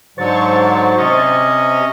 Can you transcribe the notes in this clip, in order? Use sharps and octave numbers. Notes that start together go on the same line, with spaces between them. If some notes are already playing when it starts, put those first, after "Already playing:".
G#2 D3 F#3 C5 C#6 A6
C3 C#4 D#5